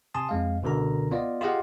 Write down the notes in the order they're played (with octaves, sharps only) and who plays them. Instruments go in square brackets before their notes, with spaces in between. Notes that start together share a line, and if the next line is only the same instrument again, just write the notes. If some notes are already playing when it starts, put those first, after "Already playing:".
[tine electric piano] C3 G#5 A5 C6 D#6
F2 G#3 F5
C#2 B2 D3 A#4 A#5
B3 F4 D5 D#5
F4 G4 G#4 D#5 F5 F#5